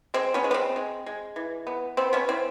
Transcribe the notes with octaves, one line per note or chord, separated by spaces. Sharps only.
G#3 C4
B3 C#4
G#3
B3
C4
G#3
G#3
E3
B3
B3 C4
B3 C#4
E3 C4